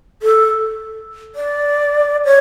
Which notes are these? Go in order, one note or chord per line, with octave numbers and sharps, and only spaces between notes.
A4
D5
C#5